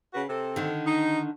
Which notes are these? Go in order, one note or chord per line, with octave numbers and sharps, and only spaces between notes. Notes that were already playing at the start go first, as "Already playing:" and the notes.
C#3 F#4 B4
C3 C4 A4
D3 D#3
D#4